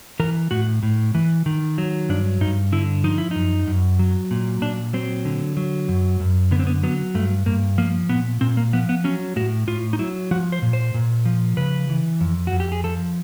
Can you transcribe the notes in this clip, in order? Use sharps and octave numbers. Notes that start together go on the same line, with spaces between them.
E3 A#4
A2 F#4
A2
E3
D#3
F#3
G2 D4
G2 D#4
D3 E4
F3 D#4
E4
F#2 D#4
F#2
F#3
A#2
A#2 D4
F#3 C4
D3
F#3
F#2
F#2
D3 B3
C4
B3
F#3 B3
G2 A3
G2 A#3
F3 A#3
A#2 B3
A#2 C4
A#3
F3 B3
B3
F#3 C#4
A2 F#4
A2 F4
D#4
F#3 E4
F3 F#4
C5
A#2
C5
A#2
F3
C#3 B4
E3
F2
F#4
F2
G4
G#4
F3 A4